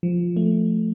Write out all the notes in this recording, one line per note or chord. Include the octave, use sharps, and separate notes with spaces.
F3
A3